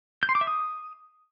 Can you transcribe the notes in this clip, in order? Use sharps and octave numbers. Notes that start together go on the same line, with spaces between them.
G6
C6
D6
E5
D#6